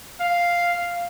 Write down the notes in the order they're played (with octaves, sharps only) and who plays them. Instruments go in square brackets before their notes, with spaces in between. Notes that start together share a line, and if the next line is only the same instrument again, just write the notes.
[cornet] F5